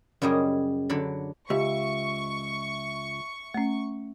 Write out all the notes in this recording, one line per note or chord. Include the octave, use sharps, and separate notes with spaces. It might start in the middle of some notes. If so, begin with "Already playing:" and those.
F#2 C#3 G3 G#4 D#5
D3 F#3 D5 B5
C#2 G4 E5 C#6
A3 C#4